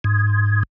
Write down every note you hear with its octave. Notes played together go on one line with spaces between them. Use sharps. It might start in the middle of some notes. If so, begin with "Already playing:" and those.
G#2